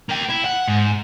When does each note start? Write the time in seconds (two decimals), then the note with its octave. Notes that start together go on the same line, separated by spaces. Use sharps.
0.09 A#3 G5
0.29 E4
0.45 F#5
0.68 G#2